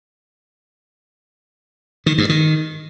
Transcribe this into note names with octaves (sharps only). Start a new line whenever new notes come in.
D#3
G2
D#3